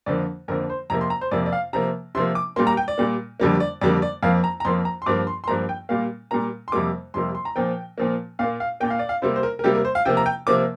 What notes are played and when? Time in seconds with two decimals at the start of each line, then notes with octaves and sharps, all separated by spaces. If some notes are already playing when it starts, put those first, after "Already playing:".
0.06 F2 D3 F3 A#3 D5
0.48 F2 D3 F3 A#3 A#4
0.70 C5
0.90 F2 C3 A#3 A#5
1.01 C6
1.10 A#5
1.21 C5
1.31 F2 C3 A#3 D5
1.46 D5
1.52 F5
1.73 C3 F3 A#3 A#5
2.15 C3 C6
2.17 F3 A#3
2.35 D6
2.56 A#2 G3 A#3 C6
2.67 A#5
2.77 G5
2.88 D5
2.98 A#2 G3 A#3
3.40 F2 D3 G3 A#3
3.60 D5
3.81 F2 D3 G3 A#3 D5
4.02 D5
4.23 F2 F3 A#3 F5
4.44 A#5
4.60 A#5
4.65 F2 F3 A#3 C6
4.85 A#5
5.02 C6
5.06 G2 F3 A#3 D6
5.27 C6
5.44 C6
5.48 G2 F3 A#3 A#5
5.69 G5
5.89 A#2 G3 A#3 F5
6.31 A#2 G3 A#3 A#5
6.68 C6
6.72 F2 C3 G3 A#3 D6
7.14 F2 C3 G3 A#3 C6
7.35 C6
7.45 A#5
7.56 A#2 F3 A#3 G5
7.98 A#2 F3 A#3
8.39 A#2 A#3 F5
8.60 F5
8.80 A#2 A#3 G5
8.90 F5
8.99 D5
9.09 F5
9.22 C3 G3 A#3 C5
9.36 C5
9.43 A#4
9.59 A#4
9.64 C3 G3 A#3 G4
9.75 A#4
9.85 C5
9.95 F5
10.05 C3 F3 A#3 G5
10.17 A#5
10.26 G5
10.47 C3 F3 A#3 D6